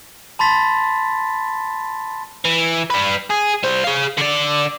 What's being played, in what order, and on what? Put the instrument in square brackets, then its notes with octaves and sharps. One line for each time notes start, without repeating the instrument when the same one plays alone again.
[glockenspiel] A5 B5 C6 A6 B6
[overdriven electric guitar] E3
G3 B4
G#4
G3 C5
G#4 F5
D3 D5